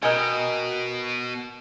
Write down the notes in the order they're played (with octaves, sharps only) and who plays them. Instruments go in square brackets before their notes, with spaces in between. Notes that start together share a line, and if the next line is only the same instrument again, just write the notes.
[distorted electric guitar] B2 [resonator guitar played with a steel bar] A#4 G#5 [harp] D#5 G5